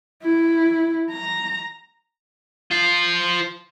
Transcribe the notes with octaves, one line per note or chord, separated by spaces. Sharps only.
E4
A#5
F4 C5